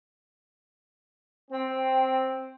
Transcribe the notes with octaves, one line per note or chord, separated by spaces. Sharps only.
C4